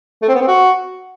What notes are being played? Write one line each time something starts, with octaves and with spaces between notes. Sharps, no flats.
A3
C4
B3
C4
F#4